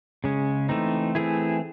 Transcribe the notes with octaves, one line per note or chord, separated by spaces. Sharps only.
C#3 G#3 C#4
E3 A3 C4 D#4
E3 A3 C4 E4 G#4